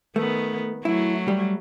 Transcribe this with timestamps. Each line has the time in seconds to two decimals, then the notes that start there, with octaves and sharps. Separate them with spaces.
0.16 D#3 A3 B3
0.85 F#3 A3 E4
1.28 G3